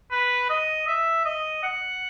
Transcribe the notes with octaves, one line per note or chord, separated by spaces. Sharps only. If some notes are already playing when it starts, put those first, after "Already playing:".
B4
D#5
E5
D#5
F#5